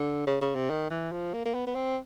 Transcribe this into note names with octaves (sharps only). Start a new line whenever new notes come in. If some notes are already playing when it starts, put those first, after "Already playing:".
Already playing: D3
C#3
C#3
C3
D#3
E3
F3
A#3
A#3
B3
B3
C4